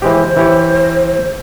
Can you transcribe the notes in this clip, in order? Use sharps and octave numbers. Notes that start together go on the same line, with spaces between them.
E3 G#3 G4 C5
E3 G4 C#5